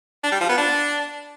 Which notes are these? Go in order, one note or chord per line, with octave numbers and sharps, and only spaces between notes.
D4
G3
F3
B3
D4